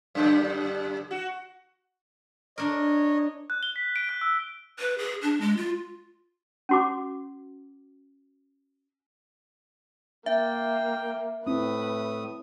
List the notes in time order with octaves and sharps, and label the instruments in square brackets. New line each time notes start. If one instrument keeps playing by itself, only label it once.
[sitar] F#2 D3 G3
F#4
[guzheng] D4 A#4 [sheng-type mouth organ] C#5 D#5
[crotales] F#6
G7
B6
D7
F#6
E6
[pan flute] B4
G#4
D4
G#3
F4
[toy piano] C#4 F#4 D6
[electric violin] A#3 [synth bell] E5 [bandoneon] G5
[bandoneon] A2 D#6 [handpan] C4 E4 [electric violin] B4